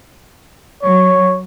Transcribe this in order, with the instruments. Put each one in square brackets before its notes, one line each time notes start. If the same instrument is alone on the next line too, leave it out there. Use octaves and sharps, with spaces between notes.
[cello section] F#3 [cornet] C#5